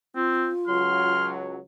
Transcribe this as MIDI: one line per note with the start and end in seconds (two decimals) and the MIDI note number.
0.16 0.49 60
0.16 1.13 65
0.68 1.59 37
0.68 1.59 54
0.68 1.33 84
0.68 1.29 89